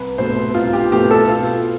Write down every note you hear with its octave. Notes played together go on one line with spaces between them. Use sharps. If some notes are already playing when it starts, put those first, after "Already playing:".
Already playing: C2 B4
B2 A3 C4 C5
C2 F4
G4
B2 A3 C4 G4
A4
B2 F4